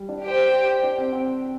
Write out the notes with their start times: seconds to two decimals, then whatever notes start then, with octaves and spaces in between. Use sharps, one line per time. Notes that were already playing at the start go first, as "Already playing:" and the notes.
Already playing: G3
0.09 D4
0.23 G4 C5 G5
0.83 D4
0.98 C4
1.13 C4